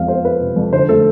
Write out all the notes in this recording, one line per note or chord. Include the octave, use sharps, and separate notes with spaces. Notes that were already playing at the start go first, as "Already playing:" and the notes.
Already playing: F2 G#3 F5
B3 C5
B3 B4
C3
F2
D3 C5
A3 A4